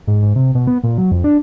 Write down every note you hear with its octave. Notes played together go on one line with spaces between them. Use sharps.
G#2
G#2
C3
B2
B3
A#2
F#3
F2
D4